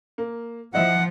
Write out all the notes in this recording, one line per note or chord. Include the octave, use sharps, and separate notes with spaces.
A#3
F3 E4 D#5 E5 F#5